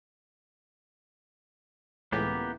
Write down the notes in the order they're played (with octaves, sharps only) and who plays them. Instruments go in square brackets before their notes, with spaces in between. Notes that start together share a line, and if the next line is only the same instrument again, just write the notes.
[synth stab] C#2 A2 E3 [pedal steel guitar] A#3 B3 G4